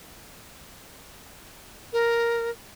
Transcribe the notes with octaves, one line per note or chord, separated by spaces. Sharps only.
A#4